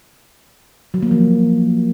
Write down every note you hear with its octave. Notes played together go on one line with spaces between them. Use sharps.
F#3
A#3
F3